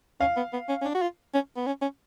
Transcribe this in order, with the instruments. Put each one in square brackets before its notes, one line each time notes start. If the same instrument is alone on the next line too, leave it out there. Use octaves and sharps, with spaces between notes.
[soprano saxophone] C#4 [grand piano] F5
[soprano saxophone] B3
B3
C#4
C#4
D4
F#4
F4
C#4
B3
C#4
C#4